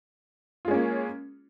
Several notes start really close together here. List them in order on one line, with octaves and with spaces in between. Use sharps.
F4 G#3 C#4 A#3